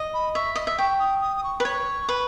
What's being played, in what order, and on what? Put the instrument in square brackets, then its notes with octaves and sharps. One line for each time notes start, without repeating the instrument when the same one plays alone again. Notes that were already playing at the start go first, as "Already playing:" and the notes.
Already playing: [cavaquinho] D#5
[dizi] B5
[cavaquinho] E5 [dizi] C#6
[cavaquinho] D#5 [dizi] D#6
[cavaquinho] E5
[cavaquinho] G5 [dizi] C#6
[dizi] D#6
D#6
D#6
C#6
[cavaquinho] B4
[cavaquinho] C#5 [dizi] C#6
[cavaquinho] B4